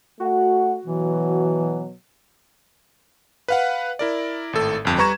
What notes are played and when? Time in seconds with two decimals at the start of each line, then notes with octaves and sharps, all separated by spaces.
0.20 A3 F#4 F#5
0.85 B2 E3 F#3
3.48 B4 F5 F#5
3.99 E4 A#4 D5
4.53 G#1 A2 A4
4.85 G1 F2
4.98 G3 B4 A#5 C#6 G#6 E7